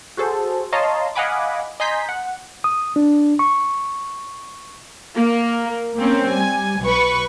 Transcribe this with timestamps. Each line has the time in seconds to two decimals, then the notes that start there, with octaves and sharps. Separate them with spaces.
0.17 F#4 G#4 A4 C5
0.72 C#5 D#5 F5 A5 A#5 C6
1.15 D#5 F5 F#5 G#5 B5 D6
1.80 D#5 G#5 A#5 C6 G6 B6
2.09 F#5
2.64 D#6
2.96 D4
3.39 C#6
5.15 A#3
5.97 A#3 C4 C#4
6.28 G3 G#5
6.83 B1 B4 C#6